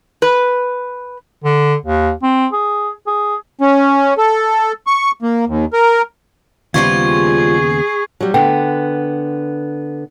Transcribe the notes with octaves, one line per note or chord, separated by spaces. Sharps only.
B4
D3
D#2
C4
G#4
G#4
C#4
A4
C#6
A#3
D#2
A#4
D#2 C#3 F3 G3 B3 F4 C#6 G#6
G#4
F#3 G3
D3 B3 G5